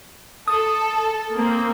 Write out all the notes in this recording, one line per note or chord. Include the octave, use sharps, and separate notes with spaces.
A4 D#6
A#3 C4